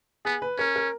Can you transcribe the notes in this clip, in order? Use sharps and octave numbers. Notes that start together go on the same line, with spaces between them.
B3 G#4
B4
C#4 A#4
A#4